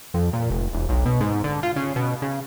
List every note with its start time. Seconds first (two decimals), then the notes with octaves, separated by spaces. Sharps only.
0.14 F2
0.33 A#2
0.50 F1
0.73 E1
0.89 B1
1.05 B2
1.21 G#2
1.44 D3
1.63 F4
1.76 C#3
1.96 B2
2.22 C#3